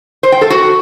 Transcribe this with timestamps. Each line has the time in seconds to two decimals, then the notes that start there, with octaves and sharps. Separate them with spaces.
0.23 C5
0.32 G5
0.41 A4
0.50 F#4